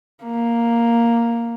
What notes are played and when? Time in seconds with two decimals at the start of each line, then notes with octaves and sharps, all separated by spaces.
0.25 A#3